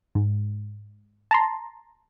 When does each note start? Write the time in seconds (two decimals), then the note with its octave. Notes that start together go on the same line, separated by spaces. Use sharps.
0.15 G#2
1.31 A5 A#5 C6